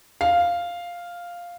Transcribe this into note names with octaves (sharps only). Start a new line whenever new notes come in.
F5